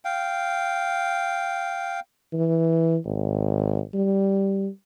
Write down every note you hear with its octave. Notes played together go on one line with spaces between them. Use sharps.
F5 G5
E3
G#1
G3